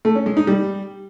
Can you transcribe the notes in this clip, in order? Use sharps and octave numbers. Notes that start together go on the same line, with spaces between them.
A3
C#4
G#3
D#4
G3